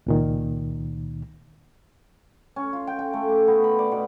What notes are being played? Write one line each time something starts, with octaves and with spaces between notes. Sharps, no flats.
C#2 A#2 D#3
C#4
F4
G5
G5
A3
D6
B3
B5
D5
B2